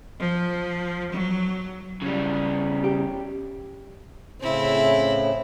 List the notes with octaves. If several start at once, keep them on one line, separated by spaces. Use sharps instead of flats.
F3
F#3
C#3 G3
G4
A2 C#3 C4 E4